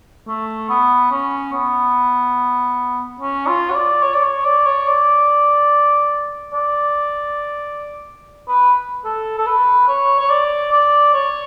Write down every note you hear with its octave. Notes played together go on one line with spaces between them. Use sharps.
A3
B3
C#4
B3
C#4
F4
C#5
D5
C#5
D5
C#5
D5
C#5
D5
D5
B4
A4
A4
B4
C#5
C#5
D5
D5
C#5